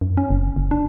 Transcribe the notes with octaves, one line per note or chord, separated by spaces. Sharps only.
F#2
C#4
F#1
F#1
D4